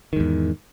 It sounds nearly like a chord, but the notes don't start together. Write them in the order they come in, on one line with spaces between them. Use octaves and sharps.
D#3 G#2 E2